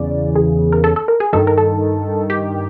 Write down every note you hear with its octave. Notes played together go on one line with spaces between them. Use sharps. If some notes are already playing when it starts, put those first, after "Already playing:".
Already playing: E2 C#3 E3 D5
G#4
A#4
A4
A4
A#4
G#4
G2 D#3 A4
A#4
A4
G4